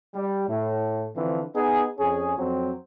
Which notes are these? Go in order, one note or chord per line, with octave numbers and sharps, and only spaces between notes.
G3
A2 A3
D3 E3 F3 C4
B3 D#4 G#4
F2 C#4 G#4
F2 F#3 C4